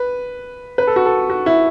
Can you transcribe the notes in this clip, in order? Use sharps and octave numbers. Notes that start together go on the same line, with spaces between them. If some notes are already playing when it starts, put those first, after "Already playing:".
Already playing: B4
B4
A4
F#4
A4
F#4
E4